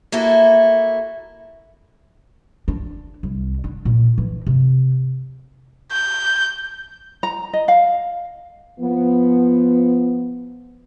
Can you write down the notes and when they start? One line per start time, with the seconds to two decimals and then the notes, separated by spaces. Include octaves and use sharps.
0.12 A#3 E4 F#4 A4
2.68 D4
3.23 C2
3.64 D4
3.85 A#2
4.18 E3
4.47 C3
5.92 G6
7.23 A#5
7.53 D#5
7.68 F5
8.81 F3 B3